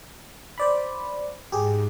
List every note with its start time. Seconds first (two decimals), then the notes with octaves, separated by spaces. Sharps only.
0.58 C5 D5 B5
1.52 G#2 G4 G#4